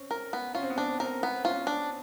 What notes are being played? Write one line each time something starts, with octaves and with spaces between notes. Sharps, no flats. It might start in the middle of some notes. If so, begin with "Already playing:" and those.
Already playing: C4 C#4
A#4
B3
C#4 F4
C4
B3
C4 D4
C4 A#4
B3
C#4 F4
D4